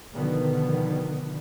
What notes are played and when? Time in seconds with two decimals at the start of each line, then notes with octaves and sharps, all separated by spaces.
0.13 B2 D3 D#3 F3 B3